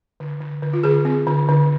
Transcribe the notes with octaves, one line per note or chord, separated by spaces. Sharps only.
D3
D3
D3
F4
D3 G#4
C4
D3
D3